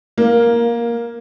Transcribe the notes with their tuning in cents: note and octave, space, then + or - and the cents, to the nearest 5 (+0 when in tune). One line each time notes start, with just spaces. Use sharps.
A#3 +10 F5 +0